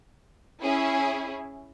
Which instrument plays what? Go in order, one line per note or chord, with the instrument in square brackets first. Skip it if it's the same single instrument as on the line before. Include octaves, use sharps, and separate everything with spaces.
[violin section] C#4 E4 G#4